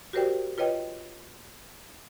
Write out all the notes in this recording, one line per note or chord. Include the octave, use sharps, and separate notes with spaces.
F#4 G4 A#4 C5 D5 G5
F4 B4 C#5 D#5 G5